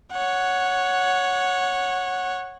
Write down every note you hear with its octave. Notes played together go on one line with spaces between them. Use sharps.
C#5 F#5